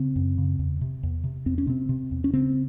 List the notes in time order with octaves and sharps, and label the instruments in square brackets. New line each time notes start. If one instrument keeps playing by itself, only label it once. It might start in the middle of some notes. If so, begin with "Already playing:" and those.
Already playing: [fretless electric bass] C#3 C4
F#2
C#3
E2
C3
E2
C3
E2 C4
C#4
C3 C4
C3
E2
C#4
C#3 C4